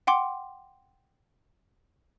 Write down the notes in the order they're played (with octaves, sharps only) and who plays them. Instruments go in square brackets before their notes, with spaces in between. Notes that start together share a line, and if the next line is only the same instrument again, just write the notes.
[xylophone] F#5 G5 C6 D6